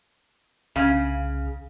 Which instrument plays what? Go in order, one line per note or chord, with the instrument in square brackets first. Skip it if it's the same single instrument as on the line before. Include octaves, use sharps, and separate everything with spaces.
[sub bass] C2 [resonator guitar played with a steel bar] C#3 [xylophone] F5 G#5 G#6